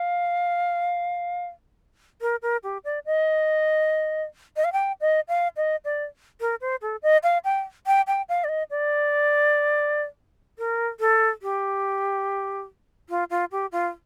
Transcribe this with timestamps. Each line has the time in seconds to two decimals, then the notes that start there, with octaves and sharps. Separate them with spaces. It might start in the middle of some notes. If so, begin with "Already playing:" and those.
Already playing: F5
2.21 A#4
2.42 A#4
2.63 G4
2.85 D5
3.06 D#5
4.56 D#5
4.64 F5
4.73 G5
5.01 D#5
5.29 F5
5.57 D#5
5.85 D5
6.41 A#4
6.61 C5
6.82 A4
7.03 D#5
7.23 F5
7.44 G5
7.87 G5
8.08 G5
8.29 F5
8.44 D5
8.49 D#5
8.71 D5
10.58 A#4
11.00 A4
11.42 G4
13.09 F4
13.30 F4
13.52 G4
13.72 F4